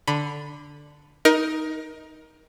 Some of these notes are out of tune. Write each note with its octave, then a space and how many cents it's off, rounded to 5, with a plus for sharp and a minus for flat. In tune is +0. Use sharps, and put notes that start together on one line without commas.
D3 +0 B5 +0
D#4 +10 A#4 +25